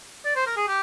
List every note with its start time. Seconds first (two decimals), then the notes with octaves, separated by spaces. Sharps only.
0.25 D5
0.36 C5
0.46 A#4
0.57 G#4
0.68 G4